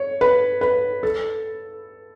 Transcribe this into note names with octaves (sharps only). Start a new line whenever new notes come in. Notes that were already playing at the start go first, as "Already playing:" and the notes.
Already playing: C#5
B4
B4
A4